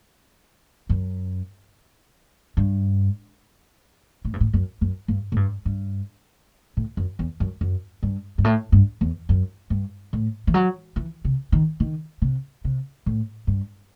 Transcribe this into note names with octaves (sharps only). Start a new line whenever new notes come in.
F#2
G2
A2
G2
A2
F#2
F#2
G2
A2
G2
G2
A2
F#2
E2
F#2
F#2
G2
G2
A2
G2
E2
F#2
G2
A2
E3
F#3
E3
C3
D#3
D#3
C3
C3
A2
G2